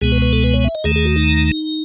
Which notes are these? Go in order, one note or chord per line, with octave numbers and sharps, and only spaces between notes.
C#2 B2 G#3 B3 G#4
B4
B4
A4
B4
C#5
E5
D#5
D#2 D#3 A3 G#4
G#4
F#4
D#4